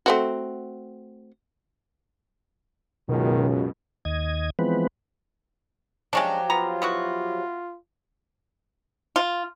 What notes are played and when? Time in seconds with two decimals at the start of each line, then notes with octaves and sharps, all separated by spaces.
0.06 A3 C4 F#4
3.09 C#2 F#2 B2 D#3
4.05 D#2 D#5 G#6
4.59 E3 F3 G#3 B3 C4 B4
6.13 F3 F#3 G#3 C#4 D4 G4
6.50 B3 F4 A#5
6.82 B3 E4 F#4
9.16 F4